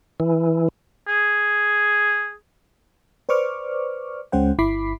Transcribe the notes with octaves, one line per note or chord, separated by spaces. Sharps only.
E3
G#4
B4 C5 D5 C#6 D6 F6
C#2 G#3 C#4 C5 F#5 G5
G1 E4 B5 D6 B6 C7